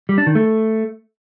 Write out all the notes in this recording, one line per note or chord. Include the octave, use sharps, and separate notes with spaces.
G3
D4
D#3
A3